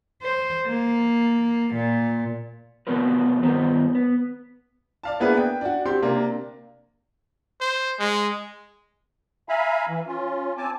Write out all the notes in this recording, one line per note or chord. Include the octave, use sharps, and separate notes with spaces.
C5
A#3
A#2
C3 A3 B3 F#4 A#4 B4
G2 D#3 B3 C5
B3
D5 F5 A5
A#3 B3 D4 E4 G#4 B4
G5
D4 F#4
C4 G4 C6
C3 A#3 D4
C5
G#3
E5 F5 G#5 A#5 B5
E3
C#4 F4
C4 G#5 A5 D6